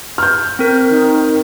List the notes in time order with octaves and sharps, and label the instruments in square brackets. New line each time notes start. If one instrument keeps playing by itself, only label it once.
[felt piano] F6 G6
[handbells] C4 A#4
[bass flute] D#3